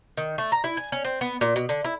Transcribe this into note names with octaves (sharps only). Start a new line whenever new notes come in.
D#3
A3
A#5
E4
G#5
C#4
C4
B3
A#2
B2
D3
E4